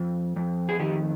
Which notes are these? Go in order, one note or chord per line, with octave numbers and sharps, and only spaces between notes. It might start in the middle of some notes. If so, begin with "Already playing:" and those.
Already playing: F2
F2
G#4
D#3 G4